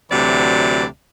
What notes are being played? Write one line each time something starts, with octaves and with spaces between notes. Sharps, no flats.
D2 C3 E3 F#3 D5